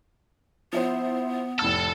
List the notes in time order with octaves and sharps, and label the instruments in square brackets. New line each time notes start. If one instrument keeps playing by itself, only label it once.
[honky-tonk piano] F3 E4 C5 [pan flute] B3
[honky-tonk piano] F1 A2 E6 [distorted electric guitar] A4 A5